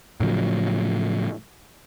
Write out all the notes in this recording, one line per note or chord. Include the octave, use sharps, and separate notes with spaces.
A2 C#3 F3 F#3